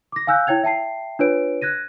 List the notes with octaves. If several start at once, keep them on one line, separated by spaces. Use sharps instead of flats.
D6 A#6
F5 G#5 E6 F#6 G6
E4 C#5 G5 G#6 F7
E5 G5 A5 C7
D4 F4 B4 C#5 D7
F#6 G#6 A#6 D#7